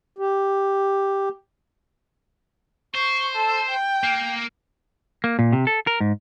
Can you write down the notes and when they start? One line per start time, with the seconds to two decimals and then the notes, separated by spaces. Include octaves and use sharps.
0.18 G4
2.95 C5 C#6
3.36 A4
3.69 G5
4.03 A#3
5.24 A#3
5.39 A#2
5.53 C3
5.67 A4
5.87 A#4
6.00 G#2